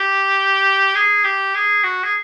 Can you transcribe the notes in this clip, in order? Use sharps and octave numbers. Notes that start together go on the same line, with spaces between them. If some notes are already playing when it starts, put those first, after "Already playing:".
Already playing: G4
G#4
G4
G#4
F#4
G#4